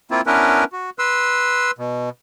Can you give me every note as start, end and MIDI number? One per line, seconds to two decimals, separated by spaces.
0.11 0.21 58
0.11 0.21 60
0.11 0.21 64
0.11 0.21 65
0.27 0.64 59
0.27 0.64 61
0.27 0.64 62
0.27 0.64 64
0.27 0.64 70
0.27 0.64 71
0.72 0.90 66
0.99 1.71 71
0.99 1.71 84
0.99 1.71 88
1.78 2.09 47